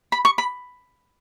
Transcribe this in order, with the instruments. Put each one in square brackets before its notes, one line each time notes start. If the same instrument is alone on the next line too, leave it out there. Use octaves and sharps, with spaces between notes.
[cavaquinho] B5
C#6
B5